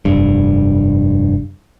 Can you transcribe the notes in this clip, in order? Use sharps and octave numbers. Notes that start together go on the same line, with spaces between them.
F1 G2